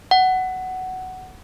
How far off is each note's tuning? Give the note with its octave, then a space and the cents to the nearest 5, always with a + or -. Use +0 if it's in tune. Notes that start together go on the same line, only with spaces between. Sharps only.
F#5 +10